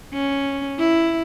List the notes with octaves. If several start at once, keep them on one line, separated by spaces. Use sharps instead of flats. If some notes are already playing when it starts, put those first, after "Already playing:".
C#4
E4